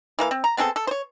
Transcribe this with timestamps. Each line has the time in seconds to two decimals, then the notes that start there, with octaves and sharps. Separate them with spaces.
0.19 E3 A#3 F5
0.31 C4
0.44 A#5
0.57 B3 C4 G#4 A4
0.76 A4
0.87 C5 C#5